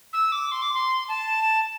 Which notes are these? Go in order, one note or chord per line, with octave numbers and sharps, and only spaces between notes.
E6
D6
C6
D6
C6
A5